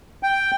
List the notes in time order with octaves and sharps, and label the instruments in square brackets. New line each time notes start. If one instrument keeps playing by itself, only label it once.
[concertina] G5